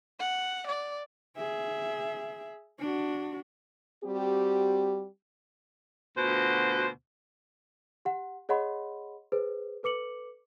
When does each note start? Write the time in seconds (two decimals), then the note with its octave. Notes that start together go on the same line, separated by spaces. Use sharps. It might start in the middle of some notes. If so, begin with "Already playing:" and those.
0.20 F#5
0.67 D5
1.37 G#4 E5
2.80 D4 F#4
4.04 G3 C4 F#4 G4
6.16 D2 B2 F4 C5
8.05 G4 F#5
8.49 G#4 C#5 D#5 F#5 B5 C6
9.32 G#4 B4 C5
9.83 A4 B4 D6 C#7 F#7